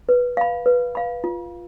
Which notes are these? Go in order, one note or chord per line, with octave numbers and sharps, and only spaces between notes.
B4
F5 B5
B4
F5 B5
F4